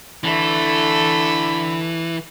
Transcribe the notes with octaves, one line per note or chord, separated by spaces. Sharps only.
D3 E3 A3 A4 B5